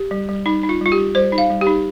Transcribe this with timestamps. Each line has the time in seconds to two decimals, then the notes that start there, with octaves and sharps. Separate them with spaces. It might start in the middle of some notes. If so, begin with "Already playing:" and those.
Already playing: G4
0.11 G3
0.29 G3
0.46 G3 D#4
0.63 D#4
0.69 F4
0.81 G3 F4
0.92 G4
0.98 G3
1.15 G3 C5
1.32 D#4
1.38 F5
1.50 G3
1.61 G4
1.67 D#4